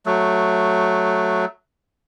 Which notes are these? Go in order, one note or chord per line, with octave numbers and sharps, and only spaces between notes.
F#3 A3